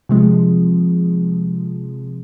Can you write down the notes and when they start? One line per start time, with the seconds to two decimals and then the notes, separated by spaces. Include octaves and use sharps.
0.09 C3 F3 G#3